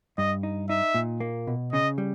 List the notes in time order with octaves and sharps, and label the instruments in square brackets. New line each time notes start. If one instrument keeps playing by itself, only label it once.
[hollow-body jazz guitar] G2 [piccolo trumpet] D#5
[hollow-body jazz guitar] D#4
[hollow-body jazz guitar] D#4 [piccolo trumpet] E5
[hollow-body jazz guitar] A#2
A#3
B2
[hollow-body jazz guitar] C#3 [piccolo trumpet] D#5
[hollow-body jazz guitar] G3